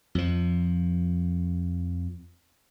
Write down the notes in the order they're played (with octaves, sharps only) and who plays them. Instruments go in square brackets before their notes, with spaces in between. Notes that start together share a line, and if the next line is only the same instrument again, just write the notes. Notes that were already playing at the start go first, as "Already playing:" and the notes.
[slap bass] F2 F3